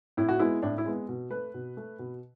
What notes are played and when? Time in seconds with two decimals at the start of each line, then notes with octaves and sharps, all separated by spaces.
0.17 A2 E4
0.29 F#4
0.40 G#3 B3 E4
0.63 A2 D4
0.78 E4
0.86 G#3 B3
1.09 B2
1.30 A3 B4
1.54 B2
1.77 A3
1.99 B2